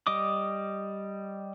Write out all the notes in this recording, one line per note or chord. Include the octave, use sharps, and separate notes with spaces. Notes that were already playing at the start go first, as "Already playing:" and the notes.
G3 D#5 D6 D#6